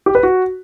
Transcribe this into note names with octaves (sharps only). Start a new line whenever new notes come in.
G4
B4
F#4